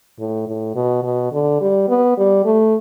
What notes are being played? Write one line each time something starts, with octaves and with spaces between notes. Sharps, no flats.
A2
A2
B2
B2
D3
G3
B3
G3
A3